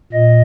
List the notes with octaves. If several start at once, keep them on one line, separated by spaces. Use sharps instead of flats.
A#2 D#5